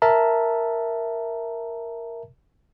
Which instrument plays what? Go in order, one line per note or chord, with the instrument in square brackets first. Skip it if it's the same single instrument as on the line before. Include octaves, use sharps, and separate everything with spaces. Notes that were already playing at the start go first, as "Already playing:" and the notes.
[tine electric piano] A#4 E5 A5 A#5